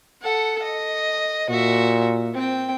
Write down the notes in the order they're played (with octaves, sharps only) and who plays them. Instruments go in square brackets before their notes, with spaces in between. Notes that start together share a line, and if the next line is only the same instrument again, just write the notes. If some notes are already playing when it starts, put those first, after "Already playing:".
[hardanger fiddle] A4 F#5
D#5
[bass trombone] A#2 [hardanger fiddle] F#4 E5
[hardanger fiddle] C4 G5